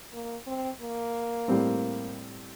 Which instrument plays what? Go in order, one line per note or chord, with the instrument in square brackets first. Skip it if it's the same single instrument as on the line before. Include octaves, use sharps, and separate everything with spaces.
[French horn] A#3
C4
A#3
[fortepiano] A2 G3 C4